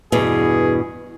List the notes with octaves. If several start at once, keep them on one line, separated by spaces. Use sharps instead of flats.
E2 G2 B2 G#4